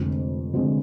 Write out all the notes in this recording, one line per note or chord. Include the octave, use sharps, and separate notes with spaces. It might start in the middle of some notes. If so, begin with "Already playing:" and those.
Already playing: F1 F2 D3 G#3
F1 F2 D3 G#3